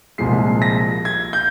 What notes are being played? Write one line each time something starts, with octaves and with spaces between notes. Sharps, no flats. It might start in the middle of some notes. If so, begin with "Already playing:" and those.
C2 A#2 F3 G#3 C7
A#6
G#6
G6